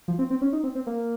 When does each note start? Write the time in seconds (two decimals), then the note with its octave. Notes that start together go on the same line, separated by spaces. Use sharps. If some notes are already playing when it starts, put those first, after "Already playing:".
0.08 F3
0.19 C4
0.30 C4
0.42 C#4
0.53 D#4
0.64 C4
0.75 C4
0.87 A#3